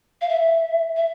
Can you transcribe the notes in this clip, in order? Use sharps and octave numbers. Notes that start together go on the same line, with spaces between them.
F5
E5
E5